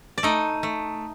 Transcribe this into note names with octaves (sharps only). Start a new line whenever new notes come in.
D5
A3 D#4 D#5
A3